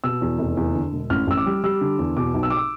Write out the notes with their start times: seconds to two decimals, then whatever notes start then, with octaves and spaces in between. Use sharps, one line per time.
0.04 B2 E6
0.21 E2
0.39 F1
0.57 E2
0.75 D3
0.93 E1
1.10 A1 F6
1.27 A1 E6
1.37 D6
1.46 G3
1.64 G3 E6
1.81 D3
1.99 E2
2.17 B2 D6
2.34 B1
2.43 E6
2.50 D6
2.57 E6